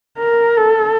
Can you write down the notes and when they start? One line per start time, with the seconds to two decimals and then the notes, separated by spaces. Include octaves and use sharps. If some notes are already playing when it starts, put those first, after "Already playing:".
0.19 A#4
0.57 A4